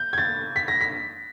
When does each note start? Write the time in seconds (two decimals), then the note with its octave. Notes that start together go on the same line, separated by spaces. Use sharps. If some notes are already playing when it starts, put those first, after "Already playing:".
Already playing: G6
0.13 G#6
0.18 A6
0.56 B6
0.68 A#6
0.81 B6